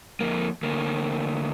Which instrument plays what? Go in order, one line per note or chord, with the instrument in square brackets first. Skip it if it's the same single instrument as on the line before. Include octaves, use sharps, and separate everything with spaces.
[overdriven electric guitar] F2 A#3
D2 A#3